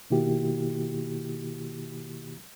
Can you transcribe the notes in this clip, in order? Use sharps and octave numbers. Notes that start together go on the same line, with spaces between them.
B2 D#3 A#3 E4 F#4 G4